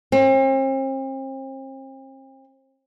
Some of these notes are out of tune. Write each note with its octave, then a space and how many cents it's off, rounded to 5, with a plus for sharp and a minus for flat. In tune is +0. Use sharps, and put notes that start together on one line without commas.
C4 +40